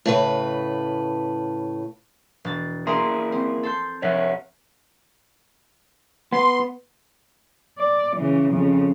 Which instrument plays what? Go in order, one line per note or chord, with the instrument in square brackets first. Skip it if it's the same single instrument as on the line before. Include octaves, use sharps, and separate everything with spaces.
[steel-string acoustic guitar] A2 C#3 B4
[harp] E1 A6
[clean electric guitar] A#3 E4 G#4 [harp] A#5 C6 D#6
[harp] C4
A4 C6 G6
[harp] F1 [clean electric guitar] C#5 E5 F#5
[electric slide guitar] B3 [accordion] C6
[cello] D5
C#3 E3
F2 C#3